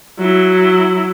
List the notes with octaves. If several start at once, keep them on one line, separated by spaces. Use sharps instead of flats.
F#3 E4